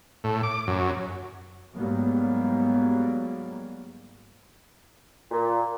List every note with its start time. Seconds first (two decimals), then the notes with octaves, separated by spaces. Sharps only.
0.24 A2
0.43 D6
0.68 F#2
1.76 G#2 F#3 G3 A#3 B3
5.31 A#2